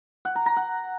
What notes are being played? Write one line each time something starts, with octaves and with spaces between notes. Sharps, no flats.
F#5
A#5
A#5
F#5